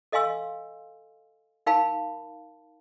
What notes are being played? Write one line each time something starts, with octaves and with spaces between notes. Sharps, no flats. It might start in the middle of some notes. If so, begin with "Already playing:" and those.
A4 D#5 F5 G#5 C6 E6
D#4 A#4 F5 G5 A5 B5